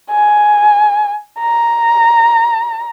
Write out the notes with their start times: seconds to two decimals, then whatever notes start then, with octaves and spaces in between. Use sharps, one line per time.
0.11 G#5
1.40 A#5